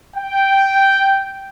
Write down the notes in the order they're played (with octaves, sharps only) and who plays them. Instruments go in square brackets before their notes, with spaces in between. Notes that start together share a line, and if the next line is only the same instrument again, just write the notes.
[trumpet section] G5